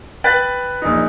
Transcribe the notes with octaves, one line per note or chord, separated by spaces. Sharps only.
B4 G5 F#6 A6 B6
A#1 D#4